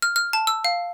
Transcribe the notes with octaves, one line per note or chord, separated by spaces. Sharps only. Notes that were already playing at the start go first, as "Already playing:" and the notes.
F6
F6
A5
E6
F5